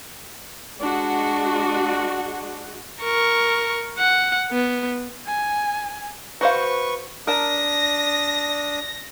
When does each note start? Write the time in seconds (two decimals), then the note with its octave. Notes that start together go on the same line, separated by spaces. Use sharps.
0.80 G#3 D4 F#4
3.04 A#4 C#6
3.98 F#5
4.52 B3
5.27 G#5
6.41 F#4 B4 C5 F5 C#6
7.27 D4 A#4 A5 D#6 A#6